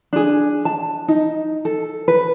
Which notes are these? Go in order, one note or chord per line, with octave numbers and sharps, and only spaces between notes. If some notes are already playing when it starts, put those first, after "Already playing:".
D4 G#4
A5
D#4
A4
B4